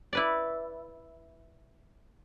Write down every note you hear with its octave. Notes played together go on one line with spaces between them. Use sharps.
E4 B4 D5